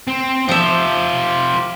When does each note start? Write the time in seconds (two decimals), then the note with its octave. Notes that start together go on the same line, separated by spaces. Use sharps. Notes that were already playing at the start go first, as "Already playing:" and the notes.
0.07 C4
0.49 F3 F4 G4 E5